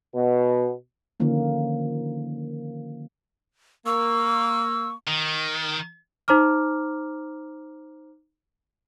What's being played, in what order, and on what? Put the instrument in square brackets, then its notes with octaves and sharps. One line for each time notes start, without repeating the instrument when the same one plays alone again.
[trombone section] B2
[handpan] D3 D#3 F3 A#3 C#4
[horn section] A#3 [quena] C#6 [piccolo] E6
[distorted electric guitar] D#3
[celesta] D#4 C5 A#5 D6 F6